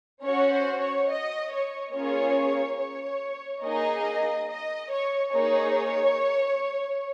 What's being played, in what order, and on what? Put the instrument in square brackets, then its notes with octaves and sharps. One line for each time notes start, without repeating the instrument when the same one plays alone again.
[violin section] C#4 F#4 C#5
C5
C#5
D#5
C#5
A#3 C#4 F4 G#4 C#5
C#5
A#3 D#4 G#4 D#5
D#5
C#5
A#3 D#4 G#4 C#5